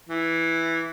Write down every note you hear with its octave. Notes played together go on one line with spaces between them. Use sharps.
E3